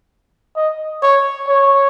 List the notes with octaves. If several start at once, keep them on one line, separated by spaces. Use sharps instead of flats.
D#5
C#5
C#5